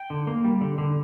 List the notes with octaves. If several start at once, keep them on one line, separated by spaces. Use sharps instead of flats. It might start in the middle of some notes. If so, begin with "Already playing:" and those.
Already playing: G5
D3
A#3
G3
D3
D3